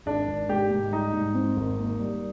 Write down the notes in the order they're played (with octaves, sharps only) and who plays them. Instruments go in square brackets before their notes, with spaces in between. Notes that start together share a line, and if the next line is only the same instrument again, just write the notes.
[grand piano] G#1 [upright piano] D4
[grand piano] G#1
[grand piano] G#2 [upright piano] G4
[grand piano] G#2
[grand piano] G3 [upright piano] D#4
[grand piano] G#2
C4
G#1
A#3
G3